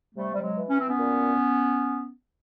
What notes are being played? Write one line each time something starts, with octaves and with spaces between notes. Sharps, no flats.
C3 G3 A3
G3
F#3 G#3
E3
C#4
C4
B3 C#4
A#2